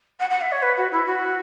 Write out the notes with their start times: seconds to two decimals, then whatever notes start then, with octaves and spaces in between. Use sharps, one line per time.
0.19 F#5
0.30 F#5
0.41 E5
0.51 C#5
0.62 B4
0.76 F#4
0.91 E4
1.05 F#4